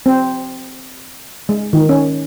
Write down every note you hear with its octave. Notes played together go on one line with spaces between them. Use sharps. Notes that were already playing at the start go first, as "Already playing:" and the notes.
C4
G#3
D#3
C#4